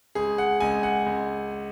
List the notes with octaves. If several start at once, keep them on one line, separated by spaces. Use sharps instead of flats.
C#2 G#4
F#5
C#2 G#5
F#5
C#2